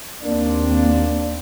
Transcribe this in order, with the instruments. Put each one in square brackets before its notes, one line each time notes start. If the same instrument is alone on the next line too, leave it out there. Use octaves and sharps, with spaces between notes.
[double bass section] D#2 C4 [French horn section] A#3 D4